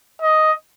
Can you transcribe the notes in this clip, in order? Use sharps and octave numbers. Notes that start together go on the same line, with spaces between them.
D#5